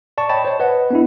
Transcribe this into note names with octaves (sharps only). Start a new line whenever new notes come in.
D5 A5 C#6
C#5 D#5 G5 A5 B5
C5 C#5
B4 D#5 F#5
B3 D4 E4